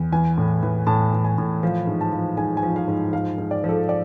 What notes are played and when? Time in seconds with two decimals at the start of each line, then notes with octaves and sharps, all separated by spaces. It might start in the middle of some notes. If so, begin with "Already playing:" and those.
Already playing: E2
0.12 E3 G#5
0.38 A2
0.63 E3
0.87 A2 A5
1.13 E3
1.25 G#5
1.38 A2
1.63 F3 F5
1.87 G#2
2.01 A5
2.12 F3
2.37 G#2 G#5
2.57 G#5
2.63 F3
2.76 F5
2.88 G#2
3.13 F3 F5
3.38 G#2
3.51 D5
3.64 F3
3.69 A4
3.89 D5